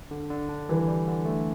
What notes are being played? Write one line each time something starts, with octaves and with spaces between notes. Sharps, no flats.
D3
D3
D4
E3 G3
G3
D3
A3